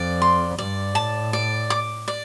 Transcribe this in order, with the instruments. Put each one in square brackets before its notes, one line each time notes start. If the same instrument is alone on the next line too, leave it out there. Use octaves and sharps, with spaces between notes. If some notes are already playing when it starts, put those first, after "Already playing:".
Already playing: [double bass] F2 [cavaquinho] D5
[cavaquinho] C6
[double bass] G2 [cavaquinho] D5
[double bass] A2 [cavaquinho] A5
[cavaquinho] D5
D6
D5